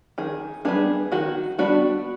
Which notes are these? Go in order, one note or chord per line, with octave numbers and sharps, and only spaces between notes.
D#3 G#4
G3 B3 D4 G#4
D#3 F#4
G3 B3 D4 F#4